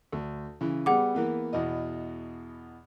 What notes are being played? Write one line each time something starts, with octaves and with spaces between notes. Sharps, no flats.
D2
C#3 E3
G3 B3 G#4 F#5 D6
E3 A#3 B3
E2 B2 D#5